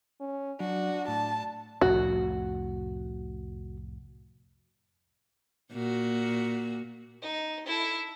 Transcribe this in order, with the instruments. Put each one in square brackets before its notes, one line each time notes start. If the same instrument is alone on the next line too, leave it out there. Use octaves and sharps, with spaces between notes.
[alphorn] C#4
[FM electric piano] F#3 [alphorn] D4 [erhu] F#4
[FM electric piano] A2 [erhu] A5
[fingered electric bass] C2 F2 A2 [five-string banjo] F#4
[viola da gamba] A#2 F#4
[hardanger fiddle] D#4
E4 A4